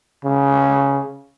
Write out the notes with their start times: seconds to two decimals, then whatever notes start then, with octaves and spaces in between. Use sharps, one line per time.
0.25 C#3